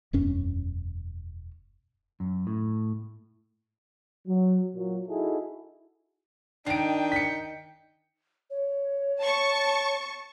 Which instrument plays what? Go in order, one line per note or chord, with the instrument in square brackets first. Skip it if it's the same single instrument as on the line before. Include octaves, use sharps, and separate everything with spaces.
[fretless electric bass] E1 F#2 C#4
[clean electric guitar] F#2
A2
[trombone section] F#3
A#2 F#3
D#4 E4 F#4 G#4 A4
[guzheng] D#3 [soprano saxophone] D4 [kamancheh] D#4 G5 [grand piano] C7 D7
[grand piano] B6 C#7
[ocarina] C#5
[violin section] A5 C#6